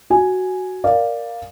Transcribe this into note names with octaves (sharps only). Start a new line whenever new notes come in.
F#4 G#5
A#4 D5 F5